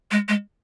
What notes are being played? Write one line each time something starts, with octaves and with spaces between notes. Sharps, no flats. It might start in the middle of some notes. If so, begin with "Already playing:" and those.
G#3
G#3